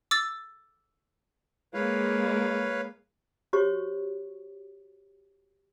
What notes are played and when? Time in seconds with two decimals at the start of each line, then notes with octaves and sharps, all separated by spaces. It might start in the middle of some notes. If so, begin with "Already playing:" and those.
0.11 D6 E6 A6
1.74 G#3 A#3 B4 C#5 F5
3.53 F#4 G4 C5 C#5 C#6